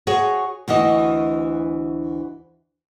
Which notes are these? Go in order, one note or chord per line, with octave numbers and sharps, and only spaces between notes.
F#4 G#4 C#5
D2 E3 F#4 D#5